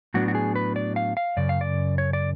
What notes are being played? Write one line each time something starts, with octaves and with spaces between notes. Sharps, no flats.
A2 F#3 B3 D4 F#4
F#4
G#4
B4
D5
F5
F5
F#2 C#3 D5
F5
D5
C#5
D5